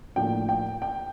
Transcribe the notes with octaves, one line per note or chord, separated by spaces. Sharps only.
A2 F3 A#3 D4 G5
G5
G5